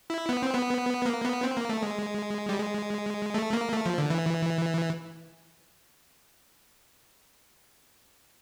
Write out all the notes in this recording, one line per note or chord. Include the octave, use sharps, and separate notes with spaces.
E4
B3
C4
B3
A#3
B3
C4
A#3
A3
G#3
G3
G#3
A3
A#3
A3
F3
D3
E3